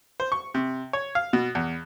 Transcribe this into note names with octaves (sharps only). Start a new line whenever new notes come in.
C5
C#6
C3
C#5
F5
B2
E2